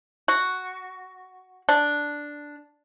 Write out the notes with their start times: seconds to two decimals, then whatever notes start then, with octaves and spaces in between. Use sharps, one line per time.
0.28 F#4
1.69 D4